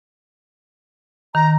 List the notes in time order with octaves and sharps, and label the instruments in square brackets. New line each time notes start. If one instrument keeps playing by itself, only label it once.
[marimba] D#3 [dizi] A#5